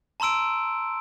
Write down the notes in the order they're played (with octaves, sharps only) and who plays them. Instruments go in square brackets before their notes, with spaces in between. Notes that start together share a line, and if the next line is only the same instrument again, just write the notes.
[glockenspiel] A5 A#5 C6 E6 D7